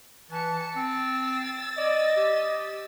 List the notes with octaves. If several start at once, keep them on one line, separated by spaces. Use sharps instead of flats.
E3 A5 C#7
C4 E6 A6
D5 D#5
G4